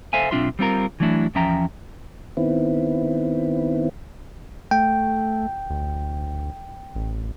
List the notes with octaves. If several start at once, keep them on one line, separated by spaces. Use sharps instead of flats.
A4 C5 E5 F5 G#5
B1 C4 D4 F4 E5 C6
G3 C4 F4 A#4
E3 F#3 A3 D4 E4
E2 F3 C#4 E5 G5 A#5
D#3 B3 C4 E4
A3 G5
D2
A1